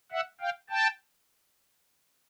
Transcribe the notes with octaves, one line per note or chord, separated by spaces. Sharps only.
E5 F#5
F5 G5
G5 A5